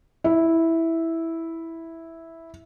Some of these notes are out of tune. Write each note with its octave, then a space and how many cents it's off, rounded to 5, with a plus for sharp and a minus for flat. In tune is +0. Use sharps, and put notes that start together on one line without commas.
E4 -5